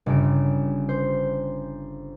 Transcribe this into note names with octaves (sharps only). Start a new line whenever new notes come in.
G1 C#3 D7
C5